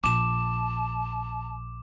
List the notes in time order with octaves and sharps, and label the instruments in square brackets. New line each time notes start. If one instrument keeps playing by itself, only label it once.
[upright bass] A#1 [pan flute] A5 [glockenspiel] D6 E7